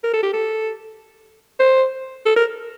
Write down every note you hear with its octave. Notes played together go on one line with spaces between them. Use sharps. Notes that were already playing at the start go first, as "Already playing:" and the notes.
A#4
A4
G4
A4
C5
A4
A#4